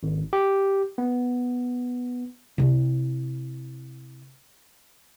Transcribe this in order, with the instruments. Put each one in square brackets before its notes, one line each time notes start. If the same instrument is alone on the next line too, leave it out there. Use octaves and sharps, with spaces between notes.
[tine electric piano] G#1
G4
B3
[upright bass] C3 E4